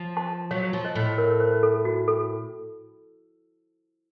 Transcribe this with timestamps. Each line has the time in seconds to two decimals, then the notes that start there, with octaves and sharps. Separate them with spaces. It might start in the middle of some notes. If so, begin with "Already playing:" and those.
Already playing: F3
0.17 A5 C6
0.51 F#3 C#5 F5
0.73 F3
0.84 C5 D#5
0.96 A2
1.18 A#4 C#5
1.40 C5
1.63 A4
1.85 F#4
2.08 A4